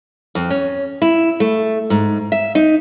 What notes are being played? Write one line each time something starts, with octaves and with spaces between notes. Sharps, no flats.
F2
C#4
E4
A3
G#2
E5
D#4